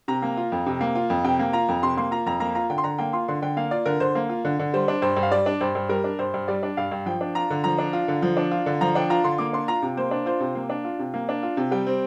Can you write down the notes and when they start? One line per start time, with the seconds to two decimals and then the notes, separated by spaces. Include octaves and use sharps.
0.08 C3 A#5
0.22 A#3
0.37 F4
0.52 F2
0.66 C3
0.81 A#3
0.95 F4
1.10 F2
1.24 C3 G5
1.39 A#3
1.53 F4 A#5
1.68 F2
1.83 C3 C6
1.97 A#3 C6
2.11 F4 A#5
2.26 F2 A#5
2.40 A#3 A#5
2.55 F4 A#5
2.70 D3 G5
2.78 C6
2.84 D3 A#5
2.98 A#3 G5
3.13 F4 C6
3.28 D3 C6
3.42 D3 G5
3.57 A#3 F5
3.71 F4 D5
3.86 D3 A#4
4.00 D3 C5
4.15 A#3
4.29 F4
4.45 D3
4.59 D3
4.74 G3 C5
4.88 D4
5.02 G2 C5
5.16 G2
5.23 F5
5.31 G3 D5
5.46 D4
5.61 G2 C5
5.75 G2
5.89 G3 A#4
6.04 D4
6.19 G2 C5
6.34 G2
6.48 G3 D5
6.63 D4
6.77 G2 F5
6.91 G2
7.06 F3 G5
7.21 D4
7.35 F4 A#5
7.50 D3
7.64 F3 A#5
7.78 D4
7.93 F4
8.08 D3
8.22 F3
8.37 D4
8.51 F4
8.66 D3
8.81 F3 A#5
8.95 D4 G5
9.10 F4 A#5
9.24 D3 C6
9.38 A#3 D6
9.53 D4 C6
9.68 F4 A#5
9.82 C3
9.97 A#3 C5
10.11 D4
10.26 F4 C5
10.40 C3
10.55 A#3
10.70 D4
10.85 F4
10.99 C3
11.14 A#3
11.29 D4
11.43 F4
11.57 C3
11.71 G3 G5
11.87 C4